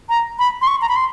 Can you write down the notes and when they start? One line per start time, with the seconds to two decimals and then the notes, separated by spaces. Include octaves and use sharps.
0.09 A#5
0.39 B5
0.61 C6
0.67 C#6
0.81 A#5
0.89 B5
0.96 C6